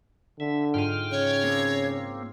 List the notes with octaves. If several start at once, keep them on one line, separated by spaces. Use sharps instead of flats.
D3 E5
G#2 F4 G5 F6 D#7
C#3 C#5
A#3 C4